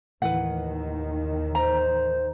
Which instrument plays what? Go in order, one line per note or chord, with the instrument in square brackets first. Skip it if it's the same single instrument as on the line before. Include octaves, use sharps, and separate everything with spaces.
[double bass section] D#2 D#3 [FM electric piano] A2 E3 [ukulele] B4 F#5
[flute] C5 [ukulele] A#5